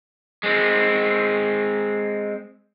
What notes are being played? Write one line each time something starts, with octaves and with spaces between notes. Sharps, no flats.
G#3 C4